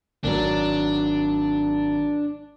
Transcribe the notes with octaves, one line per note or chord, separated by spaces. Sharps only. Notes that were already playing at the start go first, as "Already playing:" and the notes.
G#1 F#3 D4